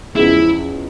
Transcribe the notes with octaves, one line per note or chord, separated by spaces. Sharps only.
E2 C#3 F3 G#3 E4